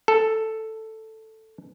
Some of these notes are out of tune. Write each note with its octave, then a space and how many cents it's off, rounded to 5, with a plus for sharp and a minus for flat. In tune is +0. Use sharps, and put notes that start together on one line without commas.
A4 +5